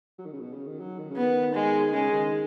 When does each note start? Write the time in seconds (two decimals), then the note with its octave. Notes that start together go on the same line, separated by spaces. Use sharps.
0.19 F#3
0.26 D#3
0.33 C#3
0.41 B2
0.54 C#3
0.67 D#3
0.80 F#3
0.98 D#3
1.10 C#3
1.17 B3
1.22 D#3
1.55 G#3
1.93 C#3 G#3
2.13 D#3
2.31 D#3